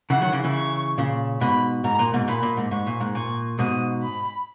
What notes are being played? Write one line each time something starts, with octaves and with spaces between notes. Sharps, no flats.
C#3 E3 F#5
D#3 F#3
C#3 E3
C#3 E3
C#6
A#2 C#3
G#2 B2 B5
G#2 A#5
A#2
G#2 B2
A#2 B5
A#2
G#2
G#2 C#6
A#2
G#2
A#2 C#6
G#2 B2 D#6
B5